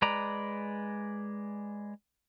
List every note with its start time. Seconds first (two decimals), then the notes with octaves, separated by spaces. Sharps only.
0.02 G#3 B4 D5 A#5